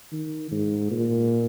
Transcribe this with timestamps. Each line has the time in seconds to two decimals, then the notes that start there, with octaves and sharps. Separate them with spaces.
0.11 D#3
0.51 G#2
0.91 A#2